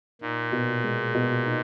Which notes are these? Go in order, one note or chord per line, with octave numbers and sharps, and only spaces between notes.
A#2 D#4
B2
G#3
B2
D#4